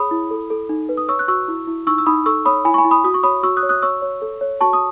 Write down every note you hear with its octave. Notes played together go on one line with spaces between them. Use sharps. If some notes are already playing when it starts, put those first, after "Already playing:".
Already playing: G#4 C#5 B5 D#6
E4
A4
A4
D#4
B4
D#6
C#5 C#6 E6
F#6
F#4 C#6 E6
E4
E4
D#4 C#6 E6
E6
D#4 B5 D#6
A4 C#6 E6
C#5 B5 D#6
E4 G#5 B5
C#6
G#5 B5
E4
B5 D#6
F#4 D#6
C#6
C#5 B5 D#6
F#4 C#6 E6
D#6 F#6
C#5
D#6 F#6
C#5 C#6 E6
C#5
A4
C#5
F#4 A5 C#6
D#6